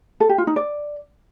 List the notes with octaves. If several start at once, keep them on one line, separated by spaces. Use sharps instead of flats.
A4
G4
F4
D#4
D5